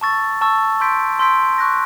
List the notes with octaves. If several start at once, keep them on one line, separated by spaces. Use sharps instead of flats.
A5 C#6 E6 A6
A5 C#6 E6 A6
C6 E6 G6 B6 D7
C6 E6 G6 B6 D7
C#6 F#6 A#6